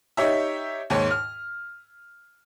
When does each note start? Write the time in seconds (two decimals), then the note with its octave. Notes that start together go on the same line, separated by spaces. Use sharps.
0.17 D#4 G4 C#5 E5
0.90 D#2 G#2 C#5
1.11 F6